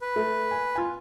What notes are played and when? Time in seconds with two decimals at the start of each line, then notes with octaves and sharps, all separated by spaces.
0.02 B4
0.16 A3
0.51 G#5
0.75 F4 G#5